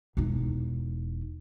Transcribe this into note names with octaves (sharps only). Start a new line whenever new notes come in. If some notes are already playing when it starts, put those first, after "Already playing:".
E1 D#4